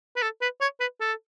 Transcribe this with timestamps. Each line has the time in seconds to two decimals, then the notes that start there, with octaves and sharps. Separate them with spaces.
0.16 B4
0.22 A4
0.42 B4
0.61 C#5
0.80 B4
1.01 A4